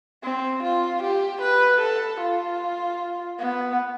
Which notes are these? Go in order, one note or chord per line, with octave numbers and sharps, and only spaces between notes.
C4
F4
G4
B4
A4
F4
B3